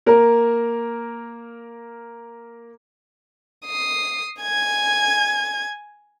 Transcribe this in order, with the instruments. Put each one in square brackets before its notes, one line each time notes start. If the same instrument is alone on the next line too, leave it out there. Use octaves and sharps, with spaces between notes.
[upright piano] A#3 A#4
[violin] D#6 C7
G#5 G#6